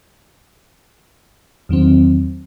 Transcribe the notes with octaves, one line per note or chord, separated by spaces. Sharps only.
E2 D#3 F#3 C4